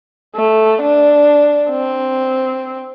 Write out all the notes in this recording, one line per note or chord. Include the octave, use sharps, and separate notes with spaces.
A3
D4
C4